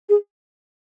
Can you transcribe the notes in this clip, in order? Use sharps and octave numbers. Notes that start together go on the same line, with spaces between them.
G#4